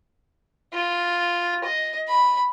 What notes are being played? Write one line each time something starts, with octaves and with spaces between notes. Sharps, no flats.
F4
D#5
B5